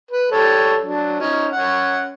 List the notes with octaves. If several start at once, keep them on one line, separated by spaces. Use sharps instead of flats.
B4
G3 A4 C#5
F#3 D4
C#4 D#4
C#4 F#5